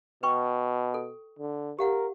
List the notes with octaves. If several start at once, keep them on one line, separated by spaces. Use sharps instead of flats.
B2 B4 G5 C#6
A4
D3
G4 A#4 F5 F#5